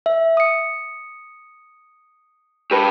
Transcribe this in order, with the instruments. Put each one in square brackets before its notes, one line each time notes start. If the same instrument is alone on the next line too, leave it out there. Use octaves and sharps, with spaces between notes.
[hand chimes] E5
D#6 C#7
[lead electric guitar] G4 B4